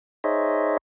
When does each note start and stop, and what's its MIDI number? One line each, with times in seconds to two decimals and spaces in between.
0.24 0.77 63
0.24 0.77 68
0.24 0.77 72
0.24 0.77 73
0.24 0.77 75
0.24 0.77 76